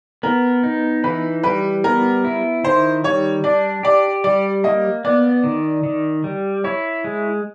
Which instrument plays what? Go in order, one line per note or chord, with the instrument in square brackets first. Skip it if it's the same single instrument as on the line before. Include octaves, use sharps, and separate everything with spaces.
[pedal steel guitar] B3 [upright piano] A#4
[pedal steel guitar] D#4
[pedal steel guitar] E3 [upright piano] B4
[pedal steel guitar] G3 [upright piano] B4
[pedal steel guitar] B3 [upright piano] A#4
[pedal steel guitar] E4
[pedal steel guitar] D#3 [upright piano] C5
[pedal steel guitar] G3 [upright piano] C#5
[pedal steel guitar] D4 [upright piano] D5
[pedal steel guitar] G4 [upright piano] D5
[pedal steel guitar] G3 [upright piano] D5
[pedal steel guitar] A#3 [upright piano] D#5
[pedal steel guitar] B3 [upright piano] D5
[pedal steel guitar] D#3
D#3
G3
[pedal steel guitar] E4 [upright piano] C#5
[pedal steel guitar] G#3